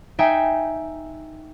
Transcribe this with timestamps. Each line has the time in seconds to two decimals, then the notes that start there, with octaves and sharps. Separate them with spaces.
0.19 D#4 E5 G5 G#5